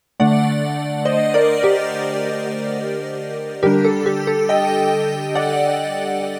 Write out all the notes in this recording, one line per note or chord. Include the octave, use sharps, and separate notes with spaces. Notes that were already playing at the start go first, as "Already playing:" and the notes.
D3 A3 D4 D5 F#5
C5 D#5
A#4 D5
G4 A#4
D3 G3 D4 G4 A#4
A4
G4
A4
D#5 G5
D5 F#5